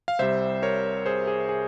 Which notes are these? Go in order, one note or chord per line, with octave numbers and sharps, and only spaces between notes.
F5
C2 C3 G3 C5 E5
A#4 C#5
G#4 C5
G#4
G#4